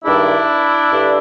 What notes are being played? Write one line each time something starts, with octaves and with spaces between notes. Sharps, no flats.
G2 D#3 G#3 D4 E4
G2 D3 G3